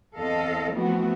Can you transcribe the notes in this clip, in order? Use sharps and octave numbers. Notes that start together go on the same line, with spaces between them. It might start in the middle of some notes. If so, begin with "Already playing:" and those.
E2 C4 A4 D#5 F5
E3 F3 A3 B3 C4 F#4